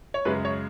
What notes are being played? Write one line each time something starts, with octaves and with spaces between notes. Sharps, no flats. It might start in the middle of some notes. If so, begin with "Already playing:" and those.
C#5
F#2 C#3 G#3 B4
C#5